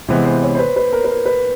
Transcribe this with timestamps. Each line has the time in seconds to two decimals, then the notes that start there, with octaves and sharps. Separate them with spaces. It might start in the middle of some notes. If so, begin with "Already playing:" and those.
0.09 C3 E3 G#3 B3 C5
0.25 C5
0.43 C#5
0.55 C5
0.59 B4
0.76 B4
0.93 A#4
1.05 B4
1.09 A#4
1.26 B4